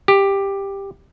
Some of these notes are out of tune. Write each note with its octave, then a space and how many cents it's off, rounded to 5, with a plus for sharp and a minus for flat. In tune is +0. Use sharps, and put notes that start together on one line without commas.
G4 +10